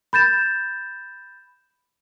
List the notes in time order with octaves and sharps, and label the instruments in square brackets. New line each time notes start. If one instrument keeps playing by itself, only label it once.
[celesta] B5 G6 A6 E7